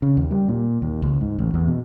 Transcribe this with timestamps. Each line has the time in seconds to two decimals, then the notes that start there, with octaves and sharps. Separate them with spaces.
0.02 C#3
0.17 D#2
0.31 G3
0.48 A#2
0.82 D#2
1.02 C#2
1.21 G#2
1.39 A1
1.54 E2
1.67 B2